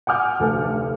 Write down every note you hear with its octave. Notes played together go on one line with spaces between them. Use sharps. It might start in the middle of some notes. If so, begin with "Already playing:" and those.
F#5 G#5 D6 F6 G6
F1 D2 A4